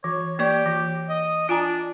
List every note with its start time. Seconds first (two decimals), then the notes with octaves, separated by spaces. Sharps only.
0.04 E3 C#5
0.39 A#3 G4 D5 C#6
0.66 E3
1.09 D#5
1.49 D4 F4 G#5 A#5